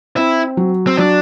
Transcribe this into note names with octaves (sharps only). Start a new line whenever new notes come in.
C4 E4
F#3
C4
F#3 D4